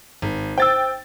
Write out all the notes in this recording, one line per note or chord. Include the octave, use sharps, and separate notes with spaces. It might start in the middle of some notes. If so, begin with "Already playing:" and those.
G#1
C5 G5 E6 A6